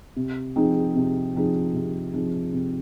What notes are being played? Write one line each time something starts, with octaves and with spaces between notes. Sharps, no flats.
C3
F3 C4 D#4 G#4
C3
F3 C4 D#4 G#4
C3
F3 C4 D#4 G#4
C3